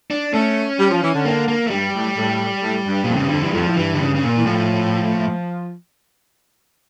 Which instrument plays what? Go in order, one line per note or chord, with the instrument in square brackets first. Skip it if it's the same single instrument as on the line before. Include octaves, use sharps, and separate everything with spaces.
[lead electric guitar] D4
[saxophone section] A3 [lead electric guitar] C#4
[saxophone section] G3
F3
E3
D3
[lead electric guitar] A#3
A#3
A3
[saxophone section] G2 [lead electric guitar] G3
[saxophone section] A2
A2
A2
G2
[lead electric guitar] A#2
[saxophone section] F2
[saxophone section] G2 [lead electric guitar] C#3
[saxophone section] F2 [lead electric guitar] D3
[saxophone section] G2 [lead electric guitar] E3
[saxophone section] F2 [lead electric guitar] F3
[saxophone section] A2
[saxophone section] G2 [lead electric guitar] E3
[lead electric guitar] D3
C#3
C#3
A#2
[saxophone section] E3
[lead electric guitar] A2 [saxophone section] F3